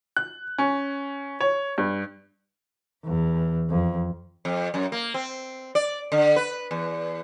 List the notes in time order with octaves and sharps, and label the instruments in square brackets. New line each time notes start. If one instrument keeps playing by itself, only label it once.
[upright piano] F#6
C#4
C#5
G2
[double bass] E2
F2
[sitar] F2
F#2
A#3
C4
D5
D3
B4
E2